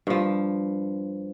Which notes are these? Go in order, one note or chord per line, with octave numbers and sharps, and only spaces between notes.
G2 F3